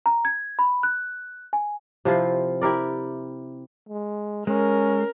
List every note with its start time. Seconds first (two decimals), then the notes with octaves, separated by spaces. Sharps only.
0.06 A#5
0.25 G#6
0.59 B5
0.83 F#6
1.53 G#5
2.05 C3 F3 E4 F4
2.62 E4 G4 A#4 D5
3.89 G#3
4.47 G#3 C#4 A#4